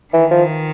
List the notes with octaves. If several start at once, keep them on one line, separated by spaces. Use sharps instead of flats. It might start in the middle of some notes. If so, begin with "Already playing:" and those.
D#3 E3
F3